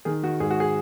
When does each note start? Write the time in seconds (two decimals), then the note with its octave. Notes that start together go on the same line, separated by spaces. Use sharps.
0.05 D#3 G#4
0.23 D#3 F#4
0.40 G#2 G#4
0.50 F#4
0.60 G#4